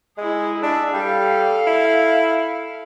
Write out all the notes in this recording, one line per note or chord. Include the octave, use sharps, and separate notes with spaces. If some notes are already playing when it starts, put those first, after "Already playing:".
G#3 E4 G#4
D4 E5
G3 A4 F5
E4